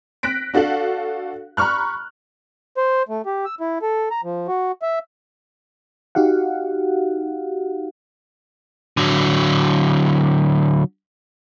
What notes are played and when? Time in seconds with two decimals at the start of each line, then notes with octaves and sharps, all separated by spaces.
0.23 F#6 A#6 B6 D7
0.54 D4 F#4 A4 F5 F#7
1.57 A#5 B5 C#6 F6 F#6
2.77 C5
3.09 A3
3.26 G4
3.46 E6
3.61 E4
3.82 A4
4.11 A#5
4.24 F3
4.48 F#4
4.82 E5
6.15 D#4 F#4 G4 F5 F#5
8.97 D3 F#3